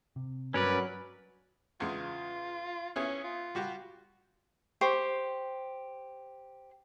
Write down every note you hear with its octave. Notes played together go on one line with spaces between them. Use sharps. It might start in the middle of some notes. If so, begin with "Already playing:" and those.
C3
G2 F#3 C#4 A#4 B4 D5
E2 C#3 G#3 F4
B3 C#4 E4 G#4
F4
G3 F#4 G4
G4 C5 C#6